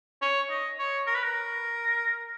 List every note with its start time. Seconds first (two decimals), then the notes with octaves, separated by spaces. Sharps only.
0.22 C#5
0.50 D#5
0.79 C#5
1.07 A#4
1.15 B4
1.23 A#4